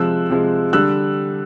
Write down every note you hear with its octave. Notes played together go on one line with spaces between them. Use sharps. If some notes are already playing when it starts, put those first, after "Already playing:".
Already playing: C3 F3 G#3 E6 F#6
C3 F3 G#3
D3 G3 E6 F#6